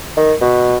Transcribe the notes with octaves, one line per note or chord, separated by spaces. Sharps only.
D#3
B2